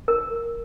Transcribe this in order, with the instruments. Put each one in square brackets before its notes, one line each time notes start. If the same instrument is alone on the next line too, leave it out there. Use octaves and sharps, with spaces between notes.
[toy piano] A#4